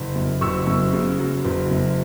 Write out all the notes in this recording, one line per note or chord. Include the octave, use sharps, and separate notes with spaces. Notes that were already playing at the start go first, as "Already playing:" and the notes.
Already playing: F#1
F#2
F#1 C#6 E6
F#2
C#3
F#3
F#1
F#2